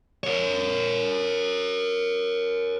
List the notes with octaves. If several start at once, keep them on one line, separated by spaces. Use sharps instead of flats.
A#4 C#5